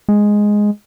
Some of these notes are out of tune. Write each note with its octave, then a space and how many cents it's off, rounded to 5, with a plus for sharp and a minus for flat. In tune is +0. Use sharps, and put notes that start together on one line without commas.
G#3 +0